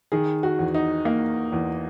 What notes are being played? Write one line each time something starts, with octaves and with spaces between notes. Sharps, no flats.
D#3 G#4
F#4
E2
D#4
A#3
E2